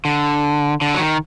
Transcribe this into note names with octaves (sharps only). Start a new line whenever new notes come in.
D3
D3
F#3
D#3